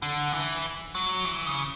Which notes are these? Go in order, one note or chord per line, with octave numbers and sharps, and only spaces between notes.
D3
E3
F#3
E3
C#3